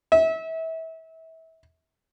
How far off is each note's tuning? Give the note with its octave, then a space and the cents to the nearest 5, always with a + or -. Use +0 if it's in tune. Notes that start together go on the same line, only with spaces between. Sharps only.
E5 -30